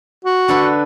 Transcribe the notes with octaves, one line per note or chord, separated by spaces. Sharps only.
F#4
D3 A4 B4